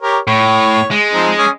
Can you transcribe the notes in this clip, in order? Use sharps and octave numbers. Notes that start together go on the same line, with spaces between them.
G4 A#4 C#5
A2 C#5
G#3
F3 C4 D#4
C#4 G#5 D#6